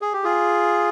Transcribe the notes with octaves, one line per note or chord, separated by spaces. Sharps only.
G#4
G4
F4 G#4